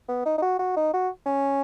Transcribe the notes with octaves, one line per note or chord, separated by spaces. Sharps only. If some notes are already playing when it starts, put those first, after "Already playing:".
B3
D#4
D#4
F#4
F#4
D#4
F#4
C#4